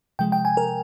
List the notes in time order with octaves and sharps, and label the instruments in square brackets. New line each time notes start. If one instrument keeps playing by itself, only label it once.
[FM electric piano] C3 F3 G#3 G5
G5
G#5
A#4